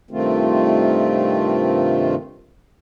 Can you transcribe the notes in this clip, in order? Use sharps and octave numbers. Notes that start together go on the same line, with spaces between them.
G2 C3 D#3 A3 C4 F4